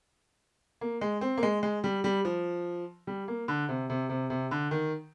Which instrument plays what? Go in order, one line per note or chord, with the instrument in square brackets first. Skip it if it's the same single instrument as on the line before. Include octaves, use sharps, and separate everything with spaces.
[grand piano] A#3
G#3
C4
A#3
G#3
G#3
G3
G3
F3
G3
A#3
D3
C3
C3
C3
C3
D3
D#3